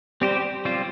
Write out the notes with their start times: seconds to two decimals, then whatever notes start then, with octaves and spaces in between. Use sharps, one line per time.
0.21 G3 C4 G4 C5
0.65 G3 C4 F4 C5